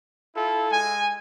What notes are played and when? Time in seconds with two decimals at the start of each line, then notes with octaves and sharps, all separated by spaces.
0.36 E4 F4 A4
0.71 G#3 G#5